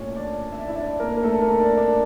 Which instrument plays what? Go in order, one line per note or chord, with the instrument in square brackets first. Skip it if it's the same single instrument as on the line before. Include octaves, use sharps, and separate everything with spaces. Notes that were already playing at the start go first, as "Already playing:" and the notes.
Already playing: [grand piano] A#2 A3 C#4 C#5
D4 D5
E5
D5
E4 E5
D4 D5
A#3 A#4
A#4
A3 A4
A#3 A#4
D4 D5
D4 D5